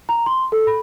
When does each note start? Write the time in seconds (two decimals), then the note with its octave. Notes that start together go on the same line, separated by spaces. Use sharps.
0.09 A#5
0.26 C6
0.52 A4
0.67 B5